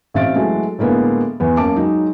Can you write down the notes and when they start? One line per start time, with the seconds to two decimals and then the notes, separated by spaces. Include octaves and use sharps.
0.14 A1 C4 E5 F5 A6 D7
0.36 E3 F#3 G#3 A3 F#4
0.78 A2 D3 G#3 A#3 B3
1.40 E2 B3
1.57 F#2 A#3 A5 D6
1.76 F#3 G#3 D#4